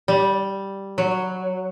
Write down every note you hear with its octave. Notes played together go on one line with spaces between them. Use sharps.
G3
F#3